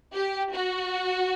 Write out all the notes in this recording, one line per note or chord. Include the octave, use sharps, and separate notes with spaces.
G4
F#4